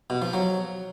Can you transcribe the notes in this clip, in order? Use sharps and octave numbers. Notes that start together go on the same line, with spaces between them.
B2
F3
F#3